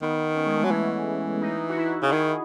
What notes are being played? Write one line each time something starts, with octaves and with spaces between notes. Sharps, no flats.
D#3 B3
C#4
G#3
A3
F#3 B3
E3 C#4
D#4
F#4
E4
C#3
D#3 G#4